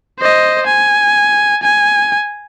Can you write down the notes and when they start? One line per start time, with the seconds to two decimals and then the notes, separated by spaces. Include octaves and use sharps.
0.19 C5 D#5
0.67 G#5
1.63 G#5